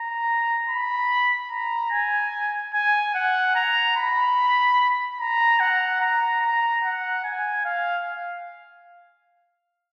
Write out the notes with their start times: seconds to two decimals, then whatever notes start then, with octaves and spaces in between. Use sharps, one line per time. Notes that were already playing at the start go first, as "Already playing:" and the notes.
Already playing: A#5
0.69 B5
1.51 A#5
1.91 G#5
2.74 G#5
3.14 F#5
3.55 A#5
3.97 B5
5.20 A#5
5.60 F#5
6.01 A#5
6.42 A#5
6.83 F#5
7.24 G#5
7.65 F5